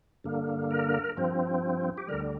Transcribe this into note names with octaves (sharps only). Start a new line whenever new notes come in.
G2 D3 A#3
A#4
G2 F3 C4
G4
D2 D3 G3 A#4